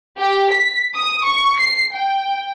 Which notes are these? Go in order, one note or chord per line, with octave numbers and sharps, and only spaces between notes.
G4
B6
D#6
C#6
C7
G5